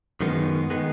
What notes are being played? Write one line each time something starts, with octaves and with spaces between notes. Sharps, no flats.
F#2 D#3 G#3 B3
D#3 G#3 B3